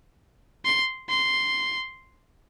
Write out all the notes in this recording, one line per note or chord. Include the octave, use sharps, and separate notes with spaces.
C6
C6